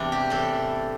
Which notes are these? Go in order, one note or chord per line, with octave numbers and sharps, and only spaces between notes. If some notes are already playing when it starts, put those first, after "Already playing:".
Already playing: E2 C3 E3 C4 D4
G4
A2 E3 A4